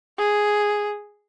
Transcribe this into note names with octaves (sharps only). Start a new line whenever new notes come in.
G#4